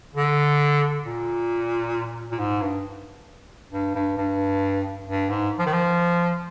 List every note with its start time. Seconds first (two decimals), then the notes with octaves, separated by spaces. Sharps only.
0.16 D3
1.04 A#2
2.31 A#2
2.39 G#2
2.61 G2
3.72 G2
3.95 G2
4.17 G2
5.07 G2
5.30 G#2
5.59 F3
5.66 D#3
5.73 F3